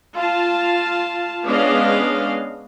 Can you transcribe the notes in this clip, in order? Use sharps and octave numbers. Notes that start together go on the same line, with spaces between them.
F4 F5 A5
G#3 B3 C#4 D4 D#5 F5